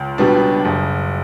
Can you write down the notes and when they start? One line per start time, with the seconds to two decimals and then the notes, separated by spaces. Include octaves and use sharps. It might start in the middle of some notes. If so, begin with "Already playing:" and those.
Already playing: C#2
0.18 B2 G3 B3 D4
0.65 F#1